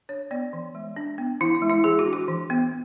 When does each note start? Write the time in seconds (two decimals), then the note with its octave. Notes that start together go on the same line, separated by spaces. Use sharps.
0.09 D4 C#5
0.31 B3 D5
0.53 E3
0.75 G#3
0.96 D4
1.18 B3
1.41 E3 E4
1.55 E4
1.62 G#3
1.70 E4
1.84 E3 G#4
1.99 F#4
2.06 D4
2.13 F#4
2.28 E3
2.50 B3